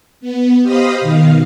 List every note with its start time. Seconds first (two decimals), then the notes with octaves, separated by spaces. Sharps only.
0.21 B3
0.62 G4 C5 D#5 F5 B5 D#6
1.01 B2 D#3 F5